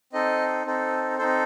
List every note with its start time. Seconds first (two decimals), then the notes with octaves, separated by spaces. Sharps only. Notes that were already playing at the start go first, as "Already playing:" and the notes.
0.13 C4 D#4 A4 D#5
0.65 C4 D#4 A4
1.18 C4 D#4 A4 C5